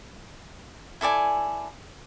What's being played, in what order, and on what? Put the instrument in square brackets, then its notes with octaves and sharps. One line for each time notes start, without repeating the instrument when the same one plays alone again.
[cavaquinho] E4 A4 D5 G#5